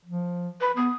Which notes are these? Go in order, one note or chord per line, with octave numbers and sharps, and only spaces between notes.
F3
B4
B3 D#6